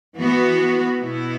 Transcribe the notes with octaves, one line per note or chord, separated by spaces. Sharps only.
E3 B3 F#4
B2 B3 E4